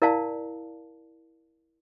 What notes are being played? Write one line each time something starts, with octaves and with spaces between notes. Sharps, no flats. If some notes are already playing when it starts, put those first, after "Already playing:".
E4 A#4 D5 F5 A5